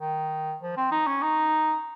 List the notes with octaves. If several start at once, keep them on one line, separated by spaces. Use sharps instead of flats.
D#3
F3
C4
D#4
C#4
D#4